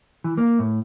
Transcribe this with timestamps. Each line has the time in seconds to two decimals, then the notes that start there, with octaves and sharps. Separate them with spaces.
0.24 E3
0.38 A#3
0.59 A2